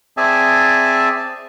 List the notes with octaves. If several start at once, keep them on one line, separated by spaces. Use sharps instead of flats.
C4 G#4 D5 E5 G#5 A5